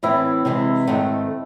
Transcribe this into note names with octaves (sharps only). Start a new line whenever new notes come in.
A2 E3 C4 E4
C3 E3 G#3
G#2 D#3 A3 C4